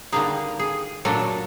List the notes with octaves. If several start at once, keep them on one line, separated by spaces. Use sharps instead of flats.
D3 G3 A#3 D#4 G#4
G#4
A#2 F#3 A3 D4 A4